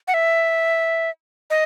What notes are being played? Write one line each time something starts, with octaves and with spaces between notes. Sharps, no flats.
F#5
E5
D#5